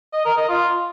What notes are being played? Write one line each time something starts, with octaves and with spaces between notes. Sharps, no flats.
D#5
A#4
D#5
F4